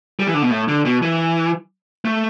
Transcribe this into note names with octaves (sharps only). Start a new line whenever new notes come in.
G3
E3
D3
B2
A2
D3
B2
E3
A3